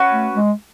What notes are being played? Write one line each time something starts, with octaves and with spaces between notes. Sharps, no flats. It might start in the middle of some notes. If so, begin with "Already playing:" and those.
Already playing: C#4 F#4 B4
A3
G#3